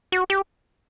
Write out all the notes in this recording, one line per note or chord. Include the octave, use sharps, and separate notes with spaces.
F#4
G4